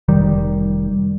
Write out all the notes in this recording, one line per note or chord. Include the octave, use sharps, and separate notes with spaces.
F1 D#3 G3